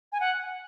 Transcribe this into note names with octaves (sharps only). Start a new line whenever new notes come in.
G#5
F#5